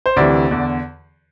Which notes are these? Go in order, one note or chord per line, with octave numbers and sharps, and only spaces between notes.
C5
D2 C3 E3 D5
E2 D3